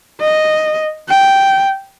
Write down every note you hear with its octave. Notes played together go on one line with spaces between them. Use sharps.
D#5
G5